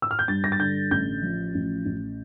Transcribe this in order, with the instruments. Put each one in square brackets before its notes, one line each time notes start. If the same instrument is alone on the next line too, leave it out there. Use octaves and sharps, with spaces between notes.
[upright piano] E6
F6
G6
G2 A6
A#6
A6
D3 G6
A1 G6
F3
A1
A1